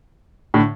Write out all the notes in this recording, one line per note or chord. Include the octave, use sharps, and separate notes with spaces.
A2 D3